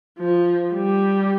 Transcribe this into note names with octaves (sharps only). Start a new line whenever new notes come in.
F3
G3